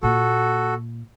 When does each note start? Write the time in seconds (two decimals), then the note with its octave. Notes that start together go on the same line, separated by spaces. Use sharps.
0.03 A#2 A#3 F#4 A4